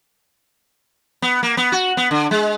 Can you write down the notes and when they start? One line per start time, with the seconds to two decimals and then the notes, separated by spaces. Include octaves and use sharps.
1.22 B3
1.43 A#3
1.57 B3
1.72 F#4
1.97 B3
2.11 D3
2.31 G#3